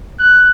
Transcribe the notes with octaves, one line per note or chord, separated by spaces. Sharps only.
F#6